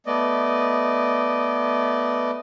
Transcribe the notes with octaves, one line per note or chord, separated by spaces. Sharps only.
A3 B3 D5 D#5